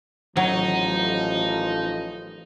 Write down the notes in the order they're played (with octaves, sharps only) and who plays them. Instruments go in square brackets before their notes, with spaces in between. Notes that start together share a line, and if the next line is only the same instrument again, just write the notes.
[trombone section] A1 D#3 F3 [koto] F#3 [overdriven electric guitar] D#4